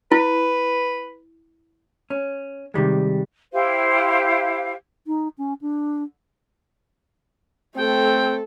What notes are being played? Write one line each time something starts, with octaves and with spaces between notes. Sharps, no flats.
E4 B4
C#4
C3 D#3 G3 G#3
E4 G4 C5 F5
D#4
C#4
D4
A3 C4 A4 G5